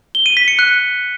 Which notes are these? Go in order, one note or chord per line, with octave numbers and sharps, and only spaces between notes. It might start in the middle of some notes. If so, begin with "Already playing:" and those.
G7
D#7
B6
C#7
F#6